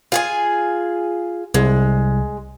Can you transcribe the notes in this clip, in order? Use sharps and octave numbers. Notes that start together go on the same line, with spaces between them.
F4 G#4 G#5
C2 G#3